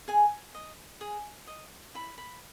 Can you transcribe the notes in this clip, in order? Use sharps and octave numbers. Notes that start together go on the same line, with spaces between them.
G#4 G#5
D#5
G#4
D#5
E4 B5
B5